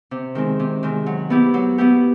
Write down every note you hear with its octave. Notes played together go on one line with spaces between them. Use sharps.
C3
D#3 G#3 C4
C3
D#3 G#3 C4
F#3
B3 E4 G4
F#3
B3 E4 G4